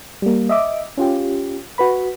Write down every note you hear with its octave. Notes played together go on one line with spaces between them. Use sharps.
G3 A#3
D#5 E5 D6
C#4 F4 G4
F#4 B4 B5